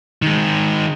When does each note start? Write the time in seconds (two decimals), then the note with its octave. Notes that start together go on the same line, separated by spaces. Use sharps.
0.22 D#3 G#3